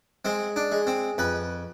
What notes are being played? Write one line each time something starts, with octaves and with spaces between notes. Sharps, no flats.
G#3 C4
D4
G#3
C4
F2 B4